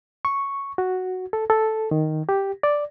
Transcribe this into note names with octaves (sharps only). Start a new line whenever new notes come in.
C#6
F#4
A4
A4
D#3
G4
D5